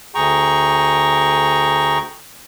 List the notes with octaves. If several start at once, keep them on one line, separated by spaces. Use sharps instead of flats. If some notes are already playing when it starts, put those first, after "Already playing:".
D2 G#4 G5 A#5 C#6